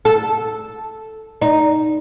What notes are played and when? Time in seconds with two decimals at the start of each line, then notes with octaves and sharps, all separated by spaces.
0.05 A4
1.42 D#4